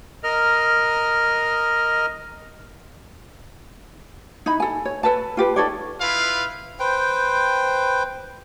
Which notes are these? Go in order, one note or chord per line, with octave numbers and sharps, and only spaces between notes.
A#4 D#5 F6
D#4 E4 B5
A4 G#5
C#5
A4 B4 A5
F4 G4 B4
D#4 A4 C#5 D5
E4 F4 B4 F5
B4 C5 G5